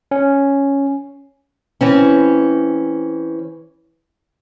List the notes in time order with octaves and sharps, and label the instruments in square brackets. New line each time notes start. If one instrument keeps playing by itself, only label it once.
[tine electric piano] C#4
[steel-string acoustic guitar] E3 C4 C#4